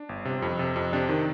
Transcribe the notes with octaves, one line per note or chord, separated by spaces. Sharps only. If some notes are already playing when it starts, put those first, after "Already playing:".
Already playing: D4
G1
C3
F2
C3
F2
C3 D4
D#3